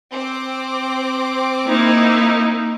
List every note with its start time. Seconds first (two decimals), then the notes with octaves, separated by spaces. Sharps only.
0.13 C4 D6
1.67 A#3 D#4 E4